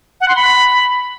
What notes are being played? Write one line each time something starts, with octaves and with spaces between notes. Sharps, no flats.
F#5
C6
B5